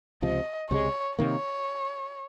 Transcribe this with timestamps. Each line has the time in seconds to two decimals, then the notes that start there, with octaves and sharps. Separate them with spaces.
0.22 C#2 C3 F3 D#5
0.70 C#2 C3 F3 G#3 C#5
1.19 C3 D#3 A#3 C#5